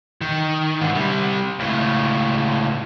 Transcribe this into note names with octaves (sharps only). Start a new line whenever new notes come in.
D#3
G#2 D3
C3 G3
C#2 A2